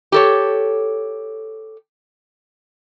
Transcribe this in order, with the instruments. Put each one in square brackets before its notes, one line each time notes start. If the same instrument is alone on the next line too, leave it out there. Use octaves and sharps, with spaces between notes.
[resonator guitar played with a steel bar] G4 A4 C#5